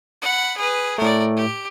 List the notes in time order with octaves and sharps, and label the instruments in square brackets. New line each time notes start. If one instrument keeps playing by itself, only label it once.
[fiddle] F#5 B5
G#4 B4
[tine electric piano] A2 A3 [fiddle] A#4 D5
[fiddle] G4